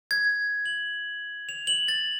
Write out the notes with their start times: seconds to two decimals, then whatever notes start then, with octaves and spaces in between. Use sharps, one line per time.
0.11 G#6
0.66 F#7
1.49 F7
1.67 F#7
1.88 A6